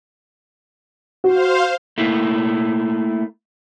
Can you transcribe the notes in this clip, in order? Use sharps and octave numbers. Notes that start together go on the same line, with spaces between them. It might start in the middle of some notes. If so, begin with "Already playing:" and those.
F#4 C5 F5
A3 A#3 E4